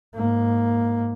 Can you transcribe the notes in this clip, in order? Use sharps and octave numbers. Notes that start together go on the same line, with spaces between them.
G#2 A#3